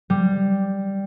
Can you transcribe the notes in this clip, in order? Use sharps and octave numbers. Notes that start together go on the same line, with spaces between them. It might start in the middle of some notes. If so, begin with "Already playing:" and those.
G3